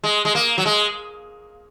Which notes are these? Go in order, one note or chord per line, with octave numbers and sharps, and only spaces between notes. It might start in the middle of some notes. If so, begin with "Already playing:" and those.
G#3
G#3
A#3
F#3
G#3